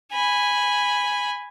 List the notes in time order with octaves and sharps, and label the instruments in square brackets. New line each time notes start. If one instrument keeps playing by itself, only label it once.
[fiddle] G#5 B5